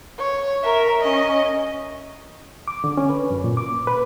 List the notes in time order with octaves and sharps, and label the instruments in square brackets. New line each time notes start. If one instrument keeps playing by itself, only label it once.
[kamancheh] C#5
A#4 E5
C#4 D#5
[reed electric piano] D6
D3
C#4
B4
F#2
A#2
D6
B4